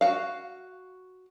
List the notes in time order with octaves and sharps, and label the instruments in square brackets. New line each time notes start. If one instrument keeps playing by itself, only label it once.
[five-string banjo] F#4 F5